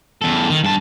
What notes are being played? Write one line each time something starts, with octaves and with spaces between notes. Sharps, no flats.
E2 A4
D#3
G2 A5